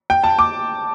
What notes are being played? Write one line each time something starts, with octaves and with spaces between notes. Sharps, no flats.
G5
A5
D6